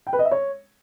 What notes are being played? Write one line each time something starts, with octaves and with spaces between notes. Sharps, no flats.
G5
B4
D#5
E5
C#5